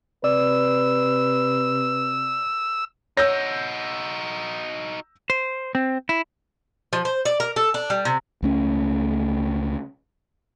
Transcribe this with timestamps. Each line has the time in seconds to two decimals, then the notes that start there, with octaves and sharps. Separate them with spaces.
0.24 C3 B4 D5 E6
3.17 D#4 F#4 C#5 E6 G6 A#6
5.30 C5
5.75 C4
6.09 E4
6.93 F3
7.05 C5
7.25 D5
7.40 A#4
7.56 A4
7.74 D4
7.90 G3
8.05 C3
8.42 C#2 A3 C#4